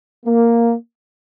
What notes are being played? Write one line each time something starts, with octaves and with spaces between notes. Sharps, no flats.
A#3